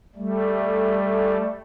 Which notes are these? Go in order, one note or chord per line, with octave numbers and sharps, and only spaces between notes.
G3 A3